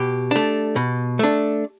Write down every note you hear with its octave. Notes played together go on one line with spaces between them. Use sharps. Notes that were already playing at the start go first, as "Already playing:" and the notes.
Already playing: B2 G4
A3 D4
B2
A3 D4